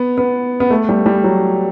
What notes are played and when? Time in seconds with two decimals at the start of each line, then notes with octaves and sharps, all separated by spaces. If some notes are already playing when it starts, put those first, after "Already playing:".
Already playing: B3
0.18 B3
0.60 B3
0.70 A3
0.89 G3
1.06 G3
1.24 F#3